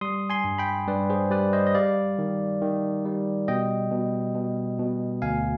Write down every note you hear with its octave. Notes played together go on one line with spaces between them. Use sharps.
G3 C6 D#6
G#5 C6
G2
G5 B5
G2 B4 D5
G#4 C5
G3 B4 D5
C5 D#5
D#5
G3 D5 F5
D#3
D#3
G3
B2 D#5 G5
B2
B2
B2
D2 F5 G#5